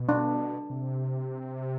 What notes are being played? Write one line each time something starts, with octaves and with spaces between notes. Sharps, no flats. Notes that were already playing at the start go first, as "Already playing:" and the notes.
Already playing: B2
D4
C3